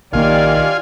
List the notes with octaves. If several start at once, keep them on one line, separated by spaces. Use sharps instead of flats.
B1 D#3 A#3 F4 G4 D5 F5 G#5